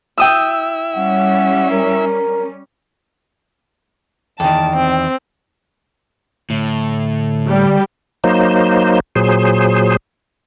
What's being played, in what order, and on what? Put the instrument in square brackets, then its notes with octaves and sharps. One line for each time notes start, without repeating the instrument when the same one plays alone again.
[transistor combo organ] E4 E5 [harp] G5 D#6 E6
[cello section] G3 C#4 [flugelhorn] F#5
[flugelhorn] A#4
[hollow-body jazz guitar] E2 D#3 [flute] G5 [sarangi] A5
[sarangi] C4
[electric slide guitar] A2 [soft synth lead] D3
[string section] G3
[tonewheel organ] F#3 A#3 D#4 C5
A#2 F#3 G#4 C5